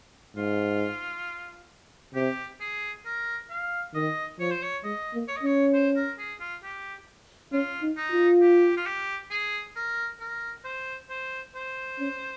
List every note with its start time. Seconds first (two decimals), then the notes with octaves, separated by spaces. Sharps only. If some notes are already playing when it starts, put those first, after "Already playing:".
0.36 G#2 F4
2.15 C3 G4
2.60 G#4
3.05 A#4
3.50 F5
3.94 D#3 D#5
4.39 F3 C#5
4.50 C5
4.62 C#5
4.84 G#3 D#5
5.14 A#3
5.28 C#5
5.37 D#5
5.43 C#4 C#5
5.73 C5
5.96 A#4
6.18 G#4
6.40 F4
6.63 G4
7.52 C#4 F4
7.82 D#4
7.97 D#4
8.12 F4
8.42 G4
8.77 F4
8.86 G4
9.31 G#4
9.76 A#4
10.20 A#4
10.64 C5
11.10 C5
11.55 C5
11.99 C#4